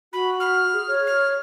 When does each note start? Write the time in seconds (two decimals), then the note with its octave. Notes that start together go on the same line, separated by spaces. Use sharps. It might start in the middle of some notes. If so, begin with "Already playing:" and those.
0.13 F#4 B5
0.40 F6
0.73 G#4
0.87 C#5
1.07 F6